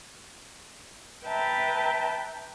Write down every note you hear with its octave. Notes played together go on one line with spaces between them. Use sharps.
B4 E5 G5 A5 A#5